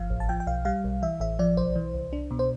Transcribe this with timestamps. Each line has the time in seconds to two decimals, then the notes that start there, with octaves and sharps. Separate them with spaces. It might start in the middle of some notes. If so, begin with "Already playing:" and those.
Already playing: G1 F3 F5
0.10 A1
0.20 A5
0.29 F3 G5
0.40 G5
0.47 B1 F5
0.65 G3 F5
0.84 B1
1.02 E3 E5
1.20 A1 E5
1.39 F3 D5
1.57 B1 C5
1.76 E3
1.94 C2
2.13 D4
2.31 B2
2.39 C5